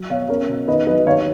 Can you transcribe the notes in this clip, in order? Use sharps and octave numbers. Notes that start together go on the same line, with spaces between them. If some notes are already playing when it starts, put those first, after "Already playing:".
Already playing: F#3
B2 C#5 F5
C#4 A#4 C#5
B2
D#3 B4 D#5
F#3 B4 D#5
D#2 C#5 F5